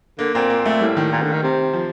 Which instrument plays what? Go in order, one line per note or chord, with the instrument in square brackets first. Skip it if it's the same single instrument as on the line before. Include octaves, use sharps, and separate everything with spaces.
[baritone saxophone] D3 [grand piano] A#3
[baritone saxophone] A#2 [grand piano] C4
[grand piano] A#3
A3
[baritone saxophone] A2 [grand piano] G3
[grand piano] D#3
[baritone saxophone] A#2
D3
D#3
C3
[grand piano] F3